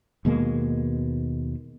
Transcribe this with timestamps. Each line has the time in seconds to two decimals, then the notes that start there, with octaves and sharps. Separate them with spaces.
0.25 D#2 B2 G#3 A#3